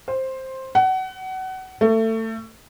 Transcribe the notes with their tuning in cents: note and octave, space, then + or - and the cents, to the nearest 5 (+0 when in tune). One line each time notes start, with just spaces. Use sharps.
C5 +10
F#5 +25
A3 +25